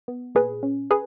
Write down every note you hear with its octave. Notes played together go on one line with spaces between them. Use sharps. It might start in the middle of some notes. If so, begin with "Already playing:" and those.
B3
A#2 G#4 B4
C#4
G#4 B4